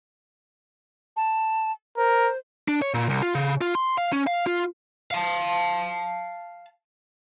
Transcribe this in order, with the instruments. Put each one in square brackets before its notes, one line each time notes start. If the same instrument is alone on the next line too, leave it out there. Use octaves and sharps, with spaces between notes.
[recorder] A5
[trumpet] A#4 [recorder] C5
[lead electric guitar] D4
C#5
A#2
C2
F4
C#3
F4
C6
F5
C#4
F5
F4
[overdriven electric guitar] F5 A5